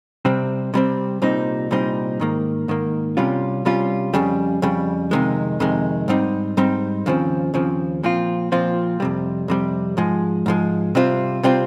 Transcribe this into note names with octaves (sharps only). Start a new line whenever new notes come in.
C3 G3 C4
C3 G3 C4
C2 A#2 G3 C4 D#4
C2 A#2 G3 C4 D#4
G#2 D#3 A#3
G#2 D#3 A#3
C2 C3 G3 C#4 F4
C2 C3 G3 C#4 F4
F2 C#3 G3
F2 C#3 G3
F2 C3 D#3 G#3
F2 C3 D#3 G#3
G#2 G3 C4 D#4
G#2 G3 C4 D#4
D#2 C#3 F3 C4
D#2 C#3 F3 C4
A#2 F3 C4 F4
A#2 F3 C4 F4
F2 C3 G3
F2 C3 G3
G#2 F3 G#3
G#2 F3 G#3
C3 G3 C4 F4
C3 G3 C4 F4